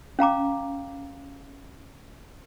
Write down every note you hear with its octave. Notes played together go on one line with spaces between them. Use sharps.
C#4 F5 A#5 D6